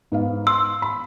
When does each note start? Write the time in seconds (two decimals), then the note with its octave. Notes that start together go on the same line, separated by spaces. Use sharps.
0.12 G#2 B3 F5
0.47 C6 E6
0.82 B5